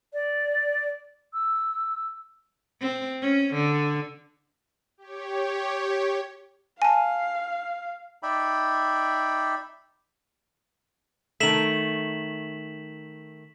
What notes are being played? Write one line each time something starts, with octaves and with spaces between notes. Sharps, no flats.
D5
E6
C4
C#4
D3
G4 C#5
F5 G#5 A5
D#4 D5 E5 G5 B5
D#3 A3 B6 E7 F#7